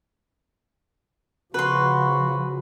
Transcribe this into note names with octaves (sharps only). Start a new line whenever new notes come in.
C#3 F3 F#4 B4 C6